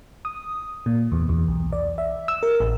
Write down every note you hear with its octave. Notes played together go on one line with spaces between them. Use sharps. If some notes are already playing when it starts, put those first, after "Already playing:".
D#6
A#2
E2
E2
B1
D5
E5
E6
A#4
A1